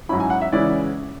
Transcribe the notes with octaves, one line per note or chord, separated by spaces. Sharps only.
G#2 F#3 C#4 E4 B5
G#5
F#5
E5
C#3 E3 G#3 C#4 E4 D5